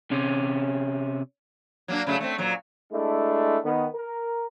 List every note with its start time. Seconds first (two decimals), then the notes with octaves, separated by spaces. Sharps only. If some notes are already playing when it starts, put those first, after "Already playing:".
0.12 C3 C#4
1.88 F#3 A#3 D4
2.07 C#3 F#3 A3
2.20 A3 C4
2.38 A#2 F#3
2.92 G#3 A3 D4 E4
3.64 D#3 B3
3.95 A#4